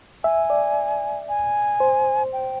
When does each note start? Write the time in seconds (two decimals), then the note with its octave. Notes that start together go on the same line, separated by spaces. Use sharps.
0.24 E5 G#5
0.50 D5
1.29 G#5
1.80 C5
2.33 G5